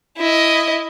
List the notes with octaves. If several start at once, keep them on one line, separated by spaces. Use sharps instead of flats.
E4 D#5